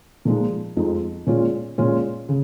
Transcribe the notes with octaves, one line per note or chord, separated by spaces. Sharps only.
A#2 F3 G#3 D#4
F2 F3 G#3 D#4
A#2 G#3 C#4 F4
A#2 G#3 C#4 F4
C#3